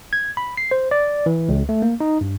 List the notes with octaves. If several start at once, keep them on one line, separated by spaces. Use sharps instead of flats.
G#6
B5
C7
C5
D5
E3
C#2
A3
A#3
D#4
G2